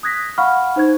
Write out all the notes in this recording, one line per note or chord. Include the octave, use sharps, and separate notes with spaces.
D#6 F#6 G#6 A#6 B6
F5 F#5 B5 C#6 F6
D#4 C5 C#6 G#6